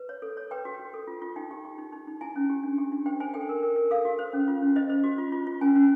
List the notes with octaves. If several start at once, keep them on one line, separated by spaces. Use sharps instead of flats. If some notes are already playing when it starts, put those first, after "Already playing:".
Already playing: B4
C#5
A4
C#5
B4 G5
F#4
F#4
A4
F4
F4
D#4 G5
G4
G4
D#4
D#4
D#4
E4 G#5
C#4
G4
D4
G4
D4
C5 G5
C5 G#5
A4 G5
A#4
A#4
A#4
A4 F5
F#4
C5
C#4
F4
C#4
C5 D#5
C5
F#4
F4
F4
F4
C#4 G#5
C#4